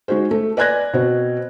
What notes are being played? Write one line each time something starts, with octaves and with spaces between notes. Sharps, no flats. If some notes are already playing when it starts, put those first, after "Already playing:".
G#3 D#4 F#4 G#4 C5
A3
B4 D5 G#5 F#6 G#6 A#6
B2 C4 F#4